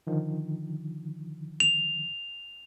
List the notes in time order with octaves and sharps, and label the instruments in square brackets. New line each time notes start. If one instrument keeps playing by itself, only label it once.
[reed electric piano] D3 D#3 F3
[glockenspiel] F7